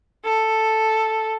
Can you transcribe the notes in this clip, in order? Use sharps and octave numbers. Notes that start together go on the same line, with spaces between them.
A4